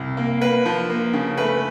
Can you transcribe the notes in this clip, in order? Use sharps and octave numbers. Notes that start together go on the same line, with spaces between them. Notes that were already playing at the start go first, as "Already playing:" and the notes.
Already playing: C2
A#3
A#3 B4
F3
A#3
C#3
A3 B4